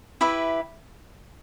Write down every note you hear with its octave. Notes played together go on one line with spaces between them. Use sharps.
E4 G4 B4 E5